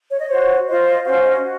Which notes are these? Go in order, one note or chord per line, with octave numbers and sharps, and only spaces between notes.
C#5
D#5
F#4 C5 C#5
F4 C5 D#5
D#5
C#4 F#4 C5 F5
D#5
F#4